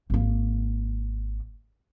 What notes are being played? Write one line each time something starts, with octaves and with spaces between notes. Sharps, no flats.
G#1 A#3